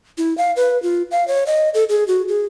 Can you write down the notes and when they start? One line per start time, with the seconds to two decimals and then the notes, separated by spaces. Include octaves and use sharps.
0.18 E4
0.38 F5
0.56 B4
0.83 F4
1.11 F5
1.28 C#5
1.47 D#5
1.74 A4
1.89 G#4
2.08 F#4
2.28 G#4